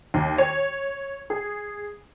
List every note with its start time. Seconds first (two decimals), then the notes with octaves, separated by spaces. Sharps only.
0.14 D#2
0.38 C#5
1.30 G#4